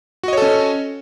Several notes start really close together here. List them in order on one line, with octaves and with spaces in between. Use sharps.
F#4 D#5 C#5 A4 C#4